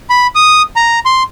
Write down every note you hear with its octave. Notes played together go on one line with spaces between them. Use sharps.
B5
D#6
A#5
C6